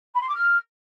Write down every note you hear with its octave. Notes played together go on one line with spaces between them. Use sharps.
B5
C6
D6
F6